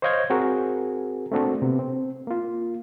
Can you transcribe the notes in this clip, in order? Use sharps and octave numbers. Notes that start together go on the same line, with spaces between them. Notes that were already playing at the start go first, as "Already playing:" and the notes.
C5 C#5 D#5 F5 G6 G#6
C4 F#4 G#4 A#4
A3 A#3 C4 D4 F#4 A4
C3 B3
C4
A#3 F4